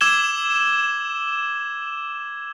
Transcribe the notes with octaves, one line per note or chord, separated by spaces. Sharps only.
D6 E6 G#6 E7 G7